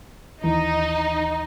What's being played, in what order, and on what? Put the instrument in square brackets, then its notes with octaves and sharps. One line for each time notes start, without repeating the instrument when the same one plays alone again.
[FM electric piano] D#2 E3 [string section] D#4